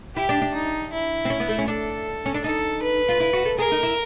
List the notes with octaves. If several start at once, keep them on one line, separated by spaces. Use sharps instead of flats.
E4 G4
D4
D4
D#4
E4
C4
C#4
B3
A3
C#4
D4 A4
C#4
D4
D#4 A4
B4
F4
E4
F#4
A4
G#4 A#4
D#4
E4